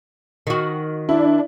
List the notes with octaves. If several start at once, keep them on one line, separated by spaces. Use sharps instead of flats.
D#3 F#4
D4 E4